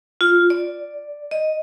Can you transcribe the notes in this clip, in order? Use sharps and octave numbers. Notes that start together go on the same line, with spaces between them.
F4
D5
D#5